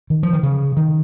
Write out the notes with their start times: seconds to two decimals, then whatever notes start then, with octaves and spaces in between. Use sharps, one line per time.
0.10 D#3
0.23 F3
0.33 D#3
0.43 C#3
0.77 D#3